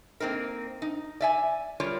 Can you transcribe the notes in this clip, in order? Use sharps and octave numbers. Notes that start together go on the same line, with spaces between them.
A#3 C4 D#4 A#4
D#4
D5 E5 G#5
G3 F4 A#4 C#5 D5